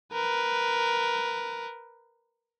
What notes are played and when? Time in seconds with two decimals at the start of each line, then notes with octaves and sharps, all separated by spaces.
0.13 A#4 B4